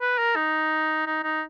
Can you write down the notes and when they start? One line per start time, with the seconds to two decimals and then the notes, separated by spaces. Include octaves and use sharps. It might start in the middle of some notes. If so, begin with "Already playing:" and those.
0.01 B4
0.18 A#4
0.35 D#4
1.07 D#4
1.23 D#4